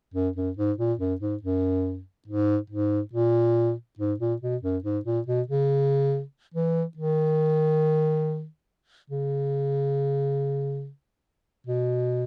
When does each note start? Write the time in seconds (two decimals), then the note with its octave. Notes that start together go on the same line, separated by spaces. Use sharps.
0.14 F#2
0.36 F#2
0.57 G#2
0.78 A#2
0.99 F#2
1.21 G#2
1.42 F#2
2.28 G#2
2.70 G#2
3.13 A#2
3.99 G#2
4.19 A#2
4.41 B2
4.63 F#2
4.84 G#2
5.05 A#2
5.27 B2
5.48 C#3
6.54 E3
6.97 D#3
9.10 C#3
11.67 B2